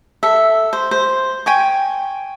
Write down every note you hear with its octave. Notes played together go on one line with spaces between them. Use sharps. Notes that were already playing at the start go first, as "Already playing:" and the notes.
A4 E5
C5
C5
G5 G#5 C#6